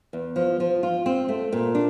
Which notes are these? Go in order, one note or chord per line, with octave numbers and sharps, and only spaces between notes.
E2
F3
F3
F4
C4
A3
A#2
D4